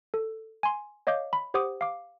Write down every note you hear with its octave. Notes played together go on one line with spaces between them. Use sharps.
A4
G#5 C6
C#5 D#5 F5 D6 G6
B5
G4 C5 F#5 D6 D#6
F5 D6